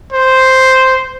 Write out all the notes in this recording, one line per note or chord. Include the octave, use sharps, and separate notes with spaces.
C5